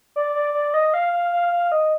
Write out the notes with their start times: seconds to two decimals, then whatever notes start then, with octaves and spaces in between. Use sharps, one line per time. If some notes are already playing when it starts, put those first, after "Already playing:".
0.16 D5
0.35 D5
0.54 D5
0.74 D#5
0.94 F5
1.13 F5
1.32 F5
1.52 F5
1.72 D#5